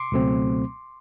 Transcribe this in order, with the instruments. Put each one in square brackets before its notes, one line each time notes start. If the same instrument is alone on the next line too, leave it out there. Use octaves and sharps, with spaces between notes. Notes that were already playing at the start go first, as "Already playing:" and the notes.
Already playing: [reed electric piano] C6 D6
C#2 B2 F#3 A3 C4